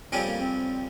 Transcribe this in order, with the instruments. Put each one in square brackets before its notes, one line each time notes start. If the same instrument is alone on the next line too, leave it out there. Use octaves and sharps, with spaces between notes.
[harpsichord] F2 C#3 G3 C#4 [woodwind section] C4
[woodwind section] A#3
C4